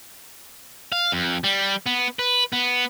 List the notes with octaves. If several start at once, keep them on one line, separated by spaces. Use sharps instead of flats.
F5
F2
G3
B3
B4
B3